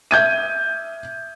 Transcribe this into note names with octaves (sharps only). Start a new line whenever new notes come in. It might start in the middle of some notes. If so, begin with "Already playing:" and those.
E5 G6 G#6 D#7